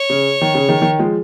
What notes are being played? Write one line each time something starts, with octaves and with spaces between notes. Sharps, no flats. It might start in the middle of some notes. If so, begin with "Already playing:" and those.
Already playing: C#5
C#3
D#3
C#3
D#3
D#3
F3 G#3